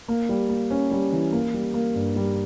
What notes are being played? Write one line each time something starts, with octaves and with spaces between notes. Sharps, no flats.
A#3
G3
A#3
C#4
G3
E3
A#3
G3
A#3
G2
G3